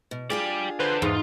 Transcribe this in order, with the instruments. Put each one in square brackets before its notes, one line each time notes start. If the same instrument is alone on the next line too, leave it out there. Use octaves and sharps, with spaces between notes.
[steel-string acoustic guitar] B2
[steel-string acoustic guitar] D4 F4 G#4 [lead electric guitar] G4 D5
[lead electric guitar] D3 [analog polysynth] B4 C5
[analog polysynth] E2 [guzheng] G#2 [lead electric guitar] F4